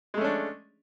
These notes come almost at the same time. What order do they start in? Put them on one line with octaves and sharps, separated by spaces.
G#3 A3 C#4 D4